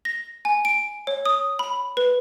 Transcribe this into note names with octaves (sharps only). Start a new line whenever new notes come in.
A#6
G#5
D7
C#5
D#6
B5
B4